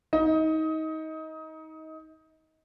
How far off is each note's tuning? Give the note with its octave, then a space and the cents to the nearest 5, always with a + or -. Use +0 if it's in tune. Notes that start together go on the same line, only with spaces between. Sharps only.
D#4 +25 D#5 +20